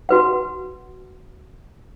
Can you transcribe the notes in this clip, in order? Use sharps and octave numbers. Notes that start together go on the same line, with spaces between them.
F#4 B4 F#5